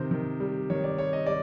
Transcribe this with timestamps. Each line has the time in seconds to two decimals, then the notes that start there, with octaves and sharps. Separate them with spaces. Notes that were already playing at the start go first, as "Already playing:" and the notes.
Already playing: C3 D#3 C5
0.11 D#3
0.40 G3
0.70 D#3 C#5
0.84 D5
0.98 G3 C#5
1.13 D#5
1.26 G3 D5